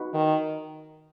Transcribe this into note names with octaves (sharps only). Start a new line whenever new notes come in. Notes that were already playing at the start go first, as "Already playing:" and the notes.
Already playing: D#4 F#4 B4
D#3